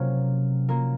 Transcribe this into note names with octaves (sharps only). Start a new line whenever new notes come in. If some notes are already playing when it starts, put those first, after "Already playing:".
Already playing: C3 F#3 A#3 C#4 F4
F#3 A#3 F4 A#4